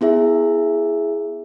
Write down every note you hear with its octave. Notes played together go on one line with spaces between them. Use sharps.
B3 E4 G#4 E5